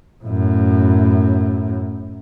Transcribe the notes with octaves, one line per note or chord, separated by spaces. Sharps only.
F#2 A2